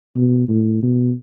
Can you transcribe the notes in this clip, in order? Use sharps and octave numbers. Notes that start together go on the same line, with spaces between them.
B2
A2
B2